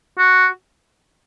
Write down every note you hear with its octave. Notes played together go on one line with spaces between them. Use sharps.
F#4